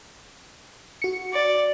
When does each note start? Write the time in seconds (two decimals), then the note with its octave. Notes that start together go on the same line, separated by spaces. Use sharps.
1.02 F#4 C#7
1.33 D5